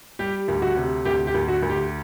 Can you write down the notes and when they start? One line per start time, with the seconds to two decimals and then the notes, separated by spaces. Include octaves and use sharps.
0.19 G3 G4
0.48 D2
0.62 F#4
0.77 C3
1.05 D2 G4
1.27 G4
1.34 D2
1.48 F#4
1.63 D2
1.70 G4